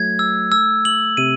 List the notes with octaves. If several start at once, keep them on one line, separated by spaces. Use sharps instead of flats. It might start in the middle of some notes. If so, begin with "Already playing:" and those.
Already playing: F#3 A3 G#6
E6
E6
F#7
C3 D#7